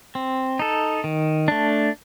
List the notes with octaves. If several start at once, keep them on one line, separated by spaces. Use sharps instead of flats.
C4
D#4 A4
D#3
A3 D4